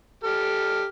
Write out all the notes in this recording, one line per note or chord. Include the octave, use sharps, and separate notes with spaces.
G4 A4 F6